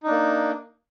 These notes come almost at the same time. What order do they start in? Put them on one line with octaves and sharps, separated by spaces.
D#4 D4 A#3